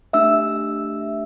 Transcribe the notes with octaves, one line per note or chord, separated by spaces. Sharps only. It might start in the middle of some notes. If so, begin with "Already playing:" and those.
A3 D4 G4 E5 E6